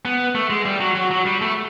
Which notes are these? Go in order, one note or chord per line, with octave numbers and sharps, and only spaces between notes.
B3
A3
G#3
G3
F#3
F#3
F#3
G3
A3